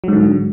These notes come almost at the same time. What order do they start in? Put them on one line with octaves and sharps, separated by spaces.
F#3 G#2 D3